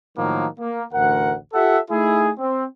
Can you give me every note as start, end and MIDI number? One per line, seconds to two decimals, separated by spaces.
0.17 0.47 45
0.17 0.47 51
0.17 0.47 53
0.17 0.47 54
0.17 0.47 58
0.59 0.82 58
0.92 1.35 33
0.92 1.35 38
0.92 1.35 70
0.92 1.35 78
1.53 1.78 65
1.53 1.78 67
1.53 1.78 69
1.53 1.78 76
1.53 1.78 78
1.90 2.30 57
1.90 2.30 63
1.90 2.30 64
1.90 2.30 68
2.37 2.65 60